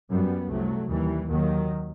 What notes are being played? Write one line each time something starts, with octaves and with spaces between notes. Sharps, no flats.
F#2 G3 B3
C2 C3 F#3 A3
D#2 E3 G3
D#2 D#3 F#3